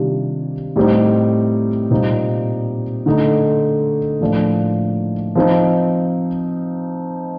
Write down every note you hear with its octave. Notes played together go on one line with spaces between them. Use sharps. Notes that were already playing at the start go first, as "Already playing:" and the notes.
Already playing: C3 D#3 G3 D4 F4
A2 G3 C4 D#4
A#2 G3 C4 D#4
D3 A3 D#4
A2 F3 A#3 D4 F4
F3 C4 D#4